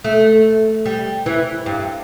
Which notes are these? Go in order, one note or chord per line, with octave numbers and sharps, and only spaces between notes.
A3
G3
E3
G2